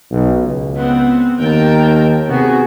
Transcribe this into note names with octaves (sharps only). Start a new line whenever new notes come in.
B1
C#2
B3 C4 F#5
D#2 A#4 G5 A5
C3 B3 F#4 G#4